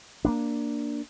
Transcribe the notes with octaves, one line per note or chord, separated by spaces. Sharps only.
A#3 B3 D4